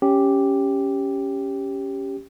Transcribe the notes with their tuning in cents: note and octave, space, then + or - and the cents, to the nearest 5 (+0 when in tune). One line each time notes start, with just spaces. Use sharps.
C#4 +0 G4 +0